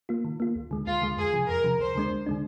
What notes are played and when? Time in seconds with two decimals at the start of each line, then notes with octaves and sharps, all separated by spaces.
0.09 A#3 F4
0.25 D#3
0.40 A#3 F4
0.56 D2
0.71 D3 G#3
0.87 D2 F4
1.01 D3 G#3
1.17 F2 G#4
1.33 C3 F3
1.49 F2 A#4
1.64 C3 F3
1.80 D2 C5
1.95 D3 G#3 D4
2.10 D2
2.26 D3 G#3 D4